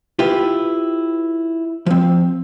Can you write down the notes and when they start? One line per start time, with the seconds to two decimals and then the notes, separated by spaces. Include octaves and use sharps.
0.19 E4 F4 G4 B4
1.86 F3 C4